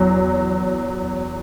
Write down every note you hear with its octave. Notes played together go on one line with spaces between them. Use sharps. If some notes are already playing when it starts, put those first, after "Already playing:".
Already playing: E2 F#3